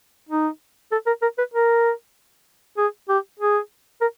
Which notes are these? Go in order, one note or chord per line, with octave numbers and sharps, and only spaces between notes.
D#4
A4
A#4
A#4
B4
A#4
G#4
G4
G#4
A#4